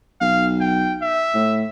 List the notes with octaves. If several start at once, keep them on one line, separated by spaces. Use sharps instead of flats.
B1 F5
G5
E5
A2